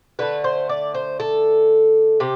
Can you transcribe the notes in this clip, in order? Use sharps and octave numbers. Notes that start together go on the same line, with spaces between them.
D3 A3 B4
C5
D5
C5
A4
C3 G4